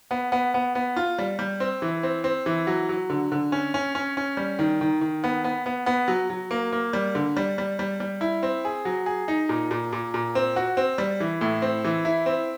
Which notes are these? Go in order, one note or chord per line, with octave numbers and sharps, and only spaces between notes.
B3
B3
B3
B3
F4
G3
G3
C4
E3
C4
C4
E3
F#3
F#3
D3
D3
C#4
C#4
C#4
C#4
G3
D#3
D#3
D#3
B3
B3
B3
B3
F#3
F#3
A#3
A#3
G3
D3
G3
G3
G3
G3
E4
C4
G#4
F#3
G#4
D#4
A#2
A#2
A#2
A#2
C4
F#4
C4
G3
E3
A2
C4
E3
E4
C4